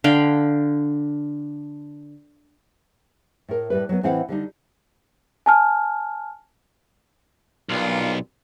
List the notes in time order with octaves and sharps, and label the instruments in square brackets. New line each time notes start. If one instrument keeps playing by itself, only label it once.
[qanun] D3 F5 G5 B5
[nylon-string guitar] A2 A#4
A2 G3 B4
F#3 B3
A2 E3 C4 E4 F5 F#5
D3 G3 D#4
[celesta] G#5 A5 F6
[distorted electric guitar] B1 [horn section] G2 A#2 F4